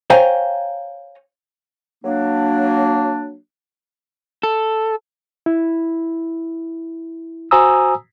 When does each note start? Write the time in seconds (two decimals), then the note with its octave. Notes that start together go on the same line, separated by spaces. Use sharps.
0.10 C5 C#5 F5 G5 G#5 A#5
2.04 F#3 A#3 D4
4.43 A4
5.46 E4
7.51 F#4 C5 G#5 A#5 D#6 E6